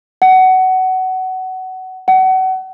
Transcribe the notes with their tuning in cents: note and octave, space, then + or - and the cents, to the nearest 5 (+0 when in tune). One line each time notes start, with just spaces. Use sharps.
F#5 +20
F#5 +30